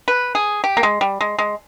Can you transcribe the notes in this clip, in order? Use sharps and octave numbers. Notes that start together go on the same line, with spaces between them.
B4
G#4
G4
A#3
G#3
G3
G#3
G#3